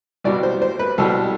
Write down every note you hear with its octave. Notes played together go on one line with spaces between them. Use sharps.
C2 B2 G3 D5
C5
C5
B4
C2 B2 G3 A4